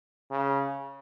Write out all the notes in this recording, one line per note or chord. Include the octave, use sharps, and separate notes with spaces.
C#3